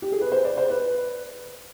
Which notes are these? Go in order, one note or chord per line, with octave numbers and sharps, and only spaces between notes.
G4
G#4
B4
C5
D5
C5
B4